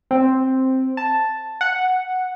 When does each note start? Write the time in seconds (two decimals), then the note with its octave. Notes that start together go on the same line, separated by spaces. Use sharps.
0.11 C4
0.97 A5
1.61 F#5